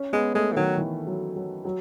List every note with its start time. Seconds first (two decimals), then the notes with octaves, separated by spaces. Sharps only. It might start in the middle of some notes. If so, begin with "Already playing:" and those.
Already playing: C#4
0.13 G#3 B3
0.34 G#3 A3
0.52 E3
0.56 D#3 F#3
0.77 E3
1.07 F#3
1.36 F#3
1.65 F#3